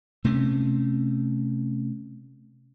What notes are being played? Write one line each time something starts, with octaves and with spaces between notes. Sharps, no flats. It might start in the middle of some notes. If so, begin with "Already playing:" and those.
C3 A3 C4 C#4